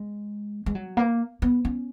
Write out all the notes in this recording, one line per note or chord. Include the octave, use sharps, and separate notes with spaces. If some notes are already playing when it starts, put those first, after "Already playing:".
Already playing: G#3
G#3
F#3
A#3
B3
C#4